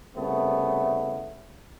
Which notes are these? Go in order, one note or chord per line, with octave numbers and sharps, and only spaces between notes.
C2 C#3 A3 B3